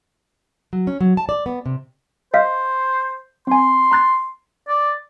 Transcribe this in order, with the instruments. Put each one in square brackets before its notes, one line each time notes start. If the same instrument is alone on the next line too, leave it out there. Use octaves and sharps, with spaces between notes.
[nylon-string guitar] F#3
C#4
F#3
A5
D5
B3
C3
[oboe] C5 [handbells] D#5 F5 B6
[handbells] C4 G#5 [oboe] C6
[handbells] A#5 F#6 A6
[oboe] D5